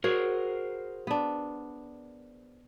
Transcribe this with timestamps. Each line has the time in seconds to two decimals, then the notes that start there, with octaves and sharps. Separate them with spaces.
0.04 F#4 G#4 A#4 C5 C#5
1.07 B3 D4